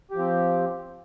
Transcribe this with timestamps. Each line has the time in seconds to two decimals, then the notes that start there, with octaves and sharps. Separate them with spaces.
0.11 G4
0.15 F3
0.19 C4